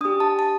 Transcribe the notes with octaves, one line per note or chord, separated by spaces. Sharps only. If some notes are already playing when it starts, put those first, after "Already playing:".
D4 G4 D#6
A5
A5